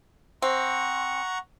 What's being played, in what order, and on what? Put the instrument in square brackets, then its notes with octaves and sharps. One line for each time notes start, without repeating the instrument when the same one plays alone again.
[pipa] C4 [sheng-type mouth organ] F#5 A#5 C#6